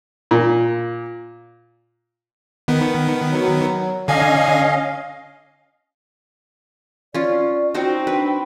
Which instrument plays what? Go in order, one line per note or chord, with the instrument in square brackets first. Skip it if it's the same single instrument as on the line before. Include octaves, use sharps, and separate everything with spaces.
[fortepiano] A#2
[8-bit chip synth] D#3 B3
[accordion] F#3
[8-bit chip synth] D3 G#5 [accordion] C#4 D#5 F5
[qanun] C#4 F4 [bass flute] D5
[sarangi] C4 [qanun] D#4 F#4 C5
[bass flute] D4 [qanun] B4